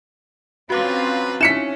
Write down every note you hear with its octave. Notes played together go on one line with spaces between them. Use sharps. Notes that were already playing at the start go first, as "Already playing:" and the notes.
F#3 C4 C#4 F4 F#4 B4 F5 D6
C#4 D#4 E4 E5 B6 C#7 E7